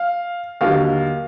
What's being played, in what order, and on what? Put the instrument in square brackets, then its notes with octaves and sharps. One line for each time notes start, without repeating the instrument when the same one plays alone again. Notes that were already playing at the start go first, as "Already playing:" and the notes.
Already playing: [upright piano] F5
D#2 D3 F#3 F5